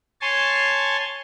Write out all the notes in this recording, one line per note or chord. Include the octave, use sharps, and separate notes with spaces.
C#5 G#5 A5 C6